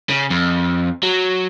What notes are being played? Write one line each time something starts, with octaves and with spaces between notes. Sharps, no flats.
C#3
F2
F#3